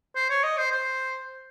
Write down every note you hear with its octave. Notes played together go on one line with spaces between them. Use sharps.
C5
C#5
D#5
C5
C5